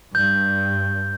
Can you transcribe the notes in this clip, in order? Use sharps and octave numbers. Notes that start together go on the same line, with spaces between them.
G2 G6